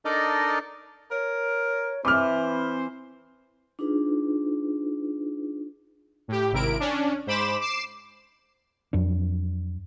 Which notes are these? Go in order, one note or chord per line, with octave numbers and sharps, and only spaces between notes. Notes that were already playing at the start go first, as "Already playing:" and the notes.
D4 D#4 A4 A#4 D5 D#5
A#4 C#5
E3 C4 C5 D6 F6
D4 D#4 F4 G#4 B4
A2 G4
G#1 C3 E4 A#4 D7
C#4 D4
G#2 C5 B5 D6 E7
D6 C7 E7
F2 F#3 D4